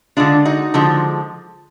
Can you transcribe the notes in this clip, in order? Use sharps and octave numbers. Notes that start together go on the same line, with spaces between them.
D3 G#3 D4 F4
D#4 F#4
D3 F3 G#3